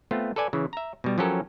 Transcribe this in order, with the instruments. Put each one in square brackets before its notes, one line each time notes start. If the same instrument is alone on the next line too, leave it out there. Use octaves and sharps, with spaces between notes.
[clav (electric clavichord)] A3 B3 C4 F4
A4 B4 D5 G#5
C#3 E3
E5 A#5
B2 G3
F3 F#3 C#4 G4 A4 A#4